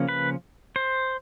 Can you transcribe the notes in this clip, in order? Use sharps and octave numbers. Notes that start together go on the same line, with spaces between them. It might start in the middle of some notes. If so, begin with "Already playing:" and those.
Already playing: C#3 F3 A#3 C#4
B4
C5